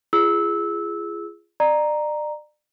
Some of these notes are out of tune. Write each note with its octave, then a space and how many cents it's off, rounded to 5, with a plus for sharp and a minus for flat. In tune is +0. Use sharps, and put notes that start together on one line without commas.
F4 -35 G#4 +0 E6 -15
D5 +35 A#5 +0